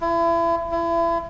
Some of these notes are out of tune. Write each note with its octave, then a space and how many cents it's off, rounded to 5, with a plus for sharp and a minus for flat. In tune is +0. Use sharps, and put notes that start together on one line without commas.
E4 +35
E4 +35